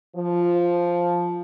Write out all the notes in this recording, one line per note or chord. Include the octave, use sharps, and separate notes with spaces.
F3